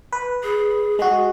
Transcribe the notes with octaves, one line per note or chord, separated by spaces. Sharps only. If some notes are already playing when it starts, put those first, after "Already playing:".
B4
G#4
G#3 F#4 G#4